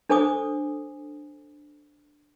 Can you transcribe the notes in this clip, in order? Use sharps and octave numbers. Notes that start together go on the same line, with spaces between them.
D4 A4 C5 G#5 D6 D#6